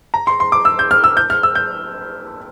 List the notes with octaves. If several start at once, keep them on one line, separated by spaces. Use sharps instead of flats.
A#5
C6
C6
D6
E6
G6
F6
E6
G6
F6
E6
G6